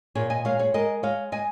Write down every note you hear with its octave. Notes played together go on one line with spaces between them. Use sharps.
A#2 G#4 C#5
D#5 G#5
G#3 C#5 F5
G#4 C#5
G#3 A#4 D#5
G#3 C#5 F5
G#3 D#5 G#5